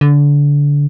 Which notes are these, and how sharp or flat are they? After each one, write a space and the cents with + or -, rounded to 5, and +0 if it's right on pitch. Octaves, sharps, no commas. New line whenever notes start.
D3 -25